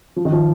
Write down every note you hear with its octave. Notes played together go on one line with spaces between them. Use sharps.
F3
D#3
F3